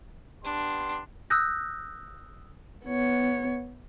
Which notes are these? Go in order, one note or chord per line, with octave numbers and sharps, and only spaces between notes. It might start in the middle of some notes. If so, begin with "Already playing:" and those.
G3 B3 D4 C6
D#6 E6 F#6 G6 A#6
B3 C#5